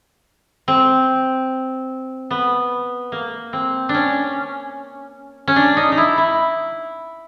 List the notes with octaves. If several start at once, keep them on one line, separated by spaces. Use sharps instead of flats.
C4
B3
A#3
C4
D4
C#4
C#4
D4
D#4
D#4
E4
E4